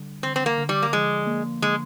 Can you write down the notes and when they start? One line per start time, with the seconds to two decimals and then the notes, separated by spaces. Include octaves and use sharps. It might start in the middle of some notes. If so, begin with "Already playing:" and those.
Already playing: D3 G3
0.22 D3 C4
0.36 C4
0.46 A#3
0.58 D3
0.69 G3
0.82 A#3
0.93 F3 G#3
1.27 A#3
1.62 D3 G#3